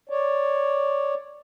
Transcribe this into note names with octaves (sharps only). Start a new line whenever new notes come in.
C#5 D5